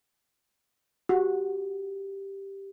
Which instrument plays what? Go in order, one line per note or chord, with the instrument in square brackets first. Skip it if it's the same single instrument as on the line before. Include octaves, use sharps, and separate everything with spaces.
[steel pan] F#4 [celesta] G4